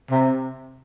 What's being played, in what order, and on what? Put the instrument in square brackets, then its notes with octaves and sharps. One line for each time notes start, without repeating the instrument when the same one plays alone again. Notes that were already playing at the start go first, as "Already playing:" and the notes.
[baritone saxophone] C3